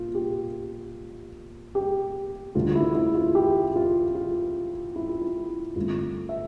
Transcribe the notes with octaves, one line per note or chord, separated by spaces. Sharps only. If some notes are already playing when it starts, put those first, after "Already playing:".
Already playing: A#2 A#3 F4
G4
G4
D2 D3 A3 F4
E4
E4
F4
G4
F4
F4
E4
F4
E4
G2 D3 A3 C4 F4
E5